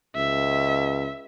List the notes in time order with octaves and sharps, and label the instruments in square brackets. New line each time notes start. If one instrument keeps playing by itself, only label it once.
[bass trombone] C#2 [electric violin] E5